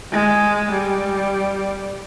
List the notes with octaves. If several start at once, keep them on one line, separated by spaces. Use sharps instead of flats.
G#3
G3